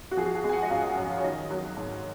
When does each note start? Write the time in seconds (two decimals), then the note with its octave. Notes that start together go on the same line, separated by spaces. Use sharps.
0.11 F#4
0.17 F3 G#4
0.26 F#4
0.35 G#4
0.44 G#3
0.49 G#5
0.53 F#5
0.63 D#5
0.70 F#2 F5
0.98 F#2
1.18 C#5
1.24 D#3 D#5
1.51 F#3
1.77 G#2